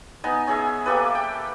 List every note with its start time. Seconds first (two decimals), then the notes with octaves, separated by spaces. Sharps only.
0.24 B3 D#4 G#5
0.47 C#4 G#4 E5
0.86 A#3 G4 A4 B4
1.15 G5